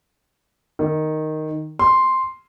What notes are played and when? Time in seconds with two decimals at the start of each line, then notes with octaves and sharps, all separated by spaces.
0.79 D#3
1.79 C6